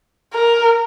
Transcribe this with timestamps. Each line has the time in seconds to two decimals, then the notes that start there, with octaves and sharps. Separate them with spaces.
0.34 A#4